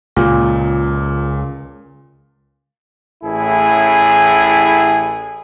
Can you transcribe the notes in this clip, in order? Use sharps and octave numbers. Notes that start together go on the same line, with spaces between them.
C#2 A#2
A1 A2 E4 G#4